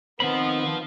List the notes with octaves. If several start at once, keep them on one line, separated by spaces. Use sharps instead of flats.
D#3 B3 C4 F4 C5 B5